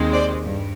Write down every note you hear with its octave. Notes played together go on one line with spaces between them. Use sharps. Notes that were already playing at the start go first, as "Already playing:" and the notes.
Already playing: D#2 D#3 G#3 C4
C5 D5
G2